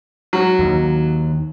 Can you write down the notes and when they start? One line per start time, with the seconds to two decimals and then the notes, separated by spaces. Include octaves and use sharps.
0.33 F#3
0.59 D#2 D#3